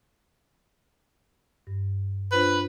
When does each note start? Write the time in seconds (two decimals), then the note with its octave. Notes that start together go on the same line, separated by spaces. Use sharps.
1.67 G2
2.32 D4 F4 B4 C5